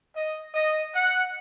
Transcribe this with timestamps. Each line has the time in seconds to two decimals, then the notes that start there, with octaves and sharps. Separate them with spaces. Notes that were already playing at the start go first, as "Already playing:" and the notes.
0.15 D#5
0.54 D#5
0.94 F#5